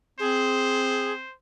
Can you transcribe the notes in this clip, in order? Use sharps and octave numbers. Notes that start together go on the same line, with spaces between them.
C4 G#4 C5